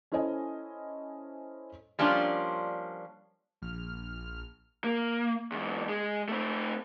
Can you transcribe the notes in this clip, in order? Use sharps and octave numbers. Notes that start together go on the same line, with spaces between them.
C#4 E4 A4 C5 D#5 G#5
F3 G3 A#3 C#4 D4 F4
A#1 F6
A#3
E2 G#2
G#3
A3 C4